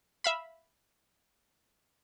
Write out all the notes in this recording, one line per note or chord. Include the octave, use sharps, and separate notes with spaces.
E5 F5 B5